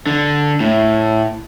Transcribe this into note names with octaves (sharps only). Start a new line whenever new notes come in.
D3
A2